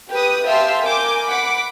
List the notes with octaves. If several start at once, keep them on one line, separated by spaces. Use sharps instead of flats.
G4 B4 D#6
G4 E5 F5 A5 C6
A#4 G#5 D6 G6
F#5 B5 D6